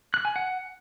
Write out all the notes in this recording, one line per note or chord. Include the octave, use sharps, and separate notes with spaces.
F#6
G#5
F#5